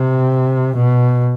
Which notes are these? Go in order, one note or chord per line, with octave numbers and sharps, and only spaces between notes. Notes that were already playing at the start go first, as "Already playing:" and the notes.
Already playing: C3
B2